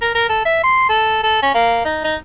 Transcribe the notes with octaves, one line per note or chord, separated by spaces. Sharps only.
A#4
A#4
A4
E5
C6
A4
A4
C#4
A#3
D#4
D#4